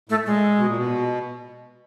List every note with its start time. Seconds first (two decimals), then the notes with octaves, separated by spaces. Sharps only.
0.09 A2 A3
0.25 A#2 G#3
0.58 B2
0.68 A#2
0.75 B2